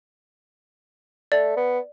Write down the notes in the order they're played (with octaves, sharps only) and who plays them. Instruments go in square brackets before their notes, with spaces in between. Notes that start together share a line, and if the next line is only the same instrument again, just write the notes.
[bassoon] A3 [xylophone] D5
[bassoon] B3